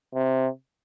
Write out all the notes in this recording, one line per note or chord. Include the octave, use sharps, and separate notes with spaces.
C3